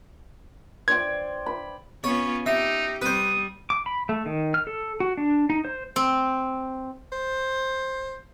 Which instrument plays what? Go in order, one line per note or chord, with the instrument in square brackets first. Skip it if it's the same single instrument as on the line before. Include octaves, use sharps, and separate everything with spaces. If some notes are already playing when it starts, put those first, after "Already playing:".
[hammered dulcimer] C5 D5 G5 [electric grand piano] G#6
[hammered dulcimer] B5
[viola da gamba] B3 C#4 F4 [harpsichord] C#5
[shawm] D#4 [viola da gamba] G4 [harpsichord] E5
[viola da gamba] G3 [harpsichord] B4 C5 [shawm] D#6
[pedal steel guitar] D6
B5
A3
D#3
F6
A4
F#4
D4
D#4
C5
[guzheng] C4
[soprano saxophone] C5